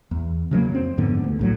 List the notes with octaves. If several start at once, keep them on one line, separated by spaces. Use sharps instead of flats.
E2
C#3 F#3 A3 A#3
F2 C4
F2 G#2 D3 B3
D2
A#1 A2 F#3